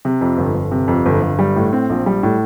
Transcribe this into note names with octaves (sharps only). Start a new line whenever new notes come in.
C3
F2
G1
G1
C3
F2
G1
G1
G3
A2
C4
A#1
G3
A2